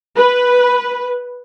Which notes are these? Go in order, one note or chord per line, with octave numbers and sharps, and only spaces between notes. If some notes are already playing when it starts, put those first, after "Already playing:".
B4